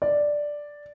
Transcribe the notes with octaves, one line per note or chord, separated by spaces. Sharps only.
D5